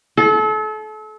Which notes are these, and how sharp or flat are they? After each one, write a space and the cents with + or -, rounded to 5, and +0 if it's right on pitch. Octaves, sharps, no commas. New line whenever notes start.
A4 -35